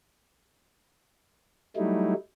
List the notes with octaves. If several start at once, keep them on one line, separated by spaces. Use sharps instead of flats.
F#3 G3 A3 D#4 E4